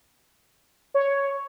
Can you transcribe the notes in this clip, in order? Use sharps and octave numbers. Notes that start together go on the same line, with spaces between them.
C#5